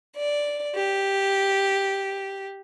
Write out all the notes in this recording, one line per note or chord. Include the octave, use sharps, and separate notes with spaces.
D5
G4